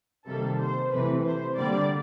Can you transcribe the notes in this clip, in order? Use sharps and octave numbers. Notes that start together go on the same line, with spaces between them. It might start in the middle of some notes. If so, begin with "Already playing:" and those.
C3 D#3 G3 A#3 A4
C5
C3 E3 A3 B4
C5
D3 G3 A#3 D5